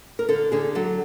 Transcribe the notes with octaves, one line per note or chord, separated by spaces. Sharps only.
A#4
D3 A4
D3 G#4
F#3 A4